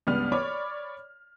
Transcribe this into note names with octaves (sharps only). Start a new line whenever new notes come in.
C#2 G2 B3 D5 F6
C#5 D5 B5 C#6 D6